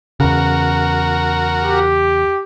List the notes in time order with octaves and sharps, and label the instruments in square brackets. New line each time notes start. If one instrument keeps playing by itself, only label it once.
[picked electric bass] E2 C#3 [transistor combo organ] F#4 A#4
[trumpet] G4